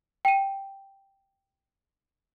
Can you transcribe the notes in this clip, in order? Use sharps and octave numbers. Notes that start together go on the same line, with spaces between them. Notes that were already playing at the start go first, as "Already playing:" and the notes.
G5 D#7